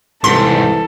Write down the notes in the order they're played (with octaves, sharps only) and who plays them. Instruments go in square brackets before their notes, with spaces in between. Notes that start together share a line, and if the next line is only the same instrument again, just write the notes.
[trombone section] C2 E3 [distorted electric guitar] G#2 C3 [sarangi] A4 [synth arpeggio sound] C6